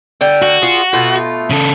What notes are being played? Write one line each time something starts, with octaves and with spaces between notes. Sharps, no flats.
D3 G5
F#4
F4 G#4
B2 A3 F4
C#3 A4